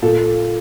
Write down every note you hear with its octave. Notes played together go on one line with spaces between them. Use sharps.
A#2 A4